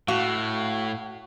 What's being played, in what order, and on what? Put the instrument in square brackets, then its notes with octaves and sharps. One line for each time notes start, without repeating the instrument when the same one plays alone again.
[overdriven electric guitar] A2 [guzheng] F#4 [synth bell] F5